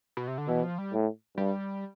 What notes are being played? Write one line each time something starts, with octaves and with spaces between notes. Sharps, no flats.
B2
C3
D3
B2 E3
F3
G3
A2
G2 G3